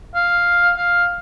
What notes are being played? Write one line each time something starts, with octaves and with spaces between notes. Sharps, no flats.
F5
F5